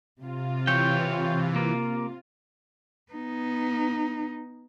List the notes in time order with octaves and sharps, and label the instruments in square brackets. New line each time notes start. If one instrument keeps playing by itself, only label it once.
[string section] C3 F4
[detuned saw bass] E3 [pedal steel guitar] C#5 G5
[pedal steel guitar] A#3
[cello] B3 D#4